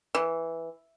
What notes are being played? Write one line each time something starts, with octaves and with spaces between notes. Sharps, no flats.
E3